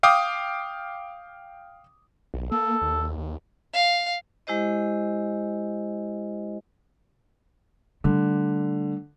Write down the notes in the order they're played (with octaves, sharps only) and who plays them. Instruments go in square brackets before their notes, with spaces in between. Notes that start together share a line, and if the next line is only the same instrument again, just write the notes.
[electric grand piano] F5 G5 D6 D#6
[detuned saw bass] B1
[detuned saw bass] A#3 [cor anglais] A4
[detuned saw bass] D#2
D#2
[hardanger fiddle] F5
[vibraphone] G#3 E4 G4 C5 D#5
[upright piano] D3 [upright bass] G3 A3